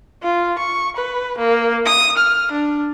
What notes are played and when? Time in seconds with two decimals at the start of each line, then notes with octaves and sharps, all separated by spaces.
0.23 F4
0.58 C#6
0.96 B4
1.38 A#3
1.86 D#6
2.17 F6
2.52 D4